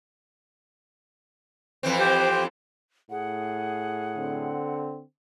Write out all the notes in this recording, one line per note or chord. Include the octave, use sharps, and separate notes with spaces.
F2 E3 C4
G4 C5 G5
A2 G#4 F#5
D3 C4